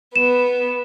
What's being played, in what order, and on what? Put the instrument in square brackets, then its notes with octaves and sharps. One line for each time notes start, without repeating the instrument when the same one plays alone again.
[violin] B3 [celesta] E7